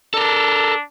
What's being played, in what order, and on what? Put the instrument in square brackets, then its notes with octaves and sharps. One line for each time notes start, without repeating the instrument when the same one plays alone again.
[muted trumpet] D4 [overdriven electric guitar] A4 A#4